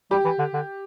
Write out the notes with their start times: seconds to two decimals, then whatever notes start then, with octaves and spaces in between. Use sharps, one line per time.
0.11 G3 G4
0.25 E3
0.39 D3
0.53 D3